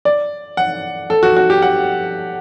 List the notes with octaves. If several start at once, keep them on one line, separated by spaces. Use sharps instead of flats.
D5
F#5
A4
F#4
F#4
G4
F#5